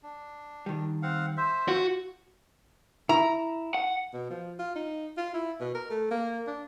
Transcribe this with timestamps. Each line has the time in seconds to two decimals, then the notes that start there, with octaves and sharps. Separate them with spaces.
0.03 D4
0.66 D#3 G3
1.02 C4 F5 F#5
1.37 C5 E5
1.68 F4 F#4
3.09 E4 A#5
3.74 F#5
4.14 B2
4.30 F3
4.59 F4
4.76 D#4
5.17 F4
5.34 E4
5.60 B2
5.75 A#4
5.91 A3
6.11 A#3
6.47 D4